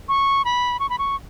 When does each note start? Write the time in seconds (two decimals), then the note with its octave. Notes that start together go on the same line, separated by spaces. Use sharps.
0.09 C#6
0.45 B5
0.80 C#6
0.90 B5
0.99 C#6